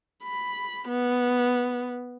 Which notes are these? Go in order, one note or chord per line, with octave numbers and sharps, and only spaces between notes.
B5
B3